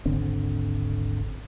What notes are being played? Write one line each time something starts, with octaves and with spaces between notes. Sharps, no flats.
D#1 G#1 D3 C4